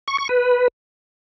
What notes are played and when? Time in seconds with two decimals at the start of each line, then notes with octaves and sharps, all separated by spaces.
0.08 C#6
0.18 C#6
0.29 B4